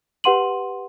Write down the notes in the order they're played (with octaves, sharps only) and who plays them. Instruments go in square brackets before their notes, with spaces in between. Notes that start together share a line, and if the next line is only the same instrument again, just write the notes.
[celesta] G4 B4 F#5 C6 D#7 F#7